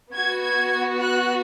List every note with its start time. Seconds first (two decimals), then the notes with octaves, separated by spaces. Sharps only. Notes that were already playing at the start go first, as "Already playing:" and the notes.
0.12 B3 F#4 G#6
0.42 G#6
1.00 F#6